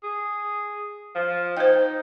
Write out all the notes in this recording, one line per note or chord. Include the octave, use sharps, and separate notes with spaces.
G#4
F3
D#4 C5 G5